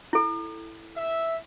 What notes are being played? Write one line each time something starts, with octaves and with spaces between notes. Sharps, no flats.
E4 A4
E5